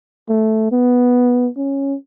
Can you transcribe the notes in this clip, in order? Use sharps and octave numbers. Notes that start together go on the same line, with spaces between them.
A3
B3
C#4